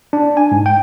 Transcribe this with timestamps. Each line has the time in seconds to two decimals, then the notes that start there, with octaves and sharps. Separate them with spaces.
0.13 D4
0.37 G#5
0.52 G#2
0.66 G5